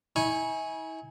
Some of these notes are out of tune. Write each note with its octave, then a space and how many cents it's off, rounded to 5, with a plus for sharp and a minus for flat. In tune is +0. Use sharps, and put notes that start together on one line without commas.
E4 -40 G#5 +0 C#6 -10